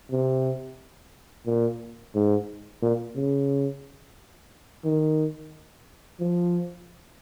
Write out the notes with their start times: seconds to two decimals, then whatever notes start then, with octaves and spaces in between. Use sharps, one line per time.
0.11 C3
1.47 A#2
2.15 G#2
2.83 A#2
3.16 C#3
4.85 D#3
6.20 F3